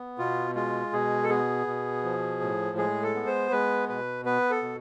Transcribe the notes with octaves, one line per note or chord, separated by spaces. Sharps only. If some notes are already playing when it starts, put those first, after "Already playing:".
Already playing: B3
B2 F4
G#3 F4
B2 G#4
A4
B3 G#4
B2
F3
A2
G#3 G#4
A4
B3
C5
G#3 B4
B2 B4
B3 B4
A4
B2